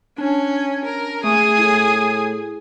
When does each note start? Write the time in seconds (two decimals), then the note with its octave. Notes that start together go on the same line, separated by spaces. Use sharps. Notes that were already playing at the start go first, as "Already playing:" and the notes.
0.18 C#4 D4
0.85 A#4
1.24 A3 G#4 D#6
1.58 A2